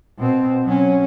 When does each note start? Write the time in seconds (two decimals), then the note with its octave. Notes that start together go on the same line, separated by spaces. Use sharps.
0.19 B2 C4
0.64 F#3 C#4